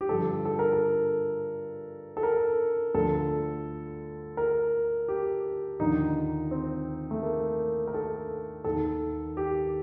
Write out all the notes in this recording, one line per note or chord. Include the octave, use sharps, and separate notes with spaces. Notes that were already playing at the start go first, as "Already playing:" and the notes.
G4
G2 D3 F3 A4
A4
A#4
A4
A4
A#4
D2 D3 F3 A4
A#4
G4
D#2 D3 F3 D#4
C4
A3
A#3
A#4
A4
D#2 D#3 A4
G4